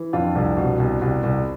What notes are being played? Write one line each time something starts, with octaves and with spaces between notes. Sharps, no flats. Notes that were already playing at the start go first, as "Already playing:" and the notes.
Already playing: E3
F2 D4 F4
C2
B2
C2
C2
C2